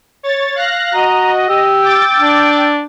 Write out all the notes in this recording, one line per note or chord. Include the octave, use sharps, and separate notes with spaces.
C#5 A6
F5 F#6 A#6
F#4 D#5 A#5
G4 E6
G5 D6 A6
D4